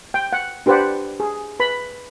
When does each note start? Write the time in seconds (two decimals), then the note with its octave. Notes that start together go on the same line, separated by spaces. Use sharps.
0.14 G5
0.33 F#5
0.66 D4 G4 B4 C5 D5 F#5
1.20 G#4
1.60 B4 B5